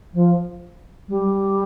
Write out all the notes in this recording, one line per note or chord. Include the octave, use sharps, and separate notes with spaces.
F3
G3